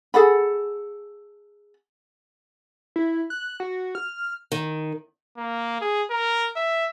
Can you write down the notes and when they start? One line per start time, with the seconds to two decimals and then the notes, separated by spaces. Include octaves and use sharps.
0.14 G#4 A4 F#5 B5
2.96 E4
3.30 F#6
3.60 F#4
3.95 F6
4.52 D#3
5.38 A#3
5.81 G#4
6.11 A#4
6.56 E5